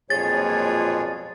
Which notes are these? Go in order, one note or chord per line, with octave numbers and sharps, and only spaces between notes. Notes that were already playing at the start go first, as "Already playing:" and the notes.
B1 F2 A#2 G#3 G#4 C#5 A6